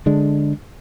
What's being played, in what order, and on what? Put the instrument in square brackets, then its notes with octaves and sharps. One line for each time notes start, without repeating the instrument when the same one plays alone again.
[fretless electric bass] D3 G#3 D4